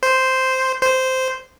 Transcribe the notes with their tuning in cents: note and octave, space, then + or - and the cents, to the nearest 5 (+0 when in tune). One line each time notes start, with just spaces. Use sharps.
C5 -5
C5 -10